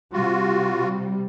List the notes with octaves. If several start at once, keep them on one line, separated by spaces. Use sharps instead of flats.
C3 G3 F4 F#4